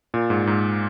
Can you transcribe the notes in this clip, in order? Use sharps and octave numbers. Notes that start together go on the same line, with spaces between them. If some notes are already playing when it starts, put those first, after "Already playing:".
A#2
G#2
G#2